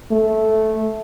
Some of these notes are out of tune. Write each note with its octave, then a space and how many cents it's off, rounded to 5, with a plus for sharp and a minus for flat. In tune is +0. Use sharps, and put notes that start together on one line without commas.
A3 -10